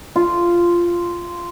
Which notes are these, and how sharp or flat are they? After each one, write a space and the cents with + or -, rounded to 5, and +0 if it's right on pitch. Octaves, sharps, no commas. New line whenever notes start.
F4 -10